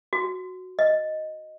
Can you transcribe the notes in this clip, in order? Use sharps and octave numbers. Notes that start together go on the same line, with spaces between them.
F#4
D#5